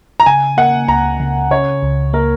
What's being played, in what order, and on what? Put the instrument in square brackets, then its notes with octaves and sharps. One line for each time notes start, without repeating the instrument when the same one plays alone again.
[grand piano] A#5
[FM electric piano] C#3 [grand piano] G#5
[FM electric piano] A#3 [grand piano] F#5
[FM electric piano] C#2 [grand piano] A#5
[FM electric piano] C#3
[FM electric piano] C#3 [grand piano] C#5
[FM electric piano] C#2
[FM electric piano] A#3 [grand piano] A#4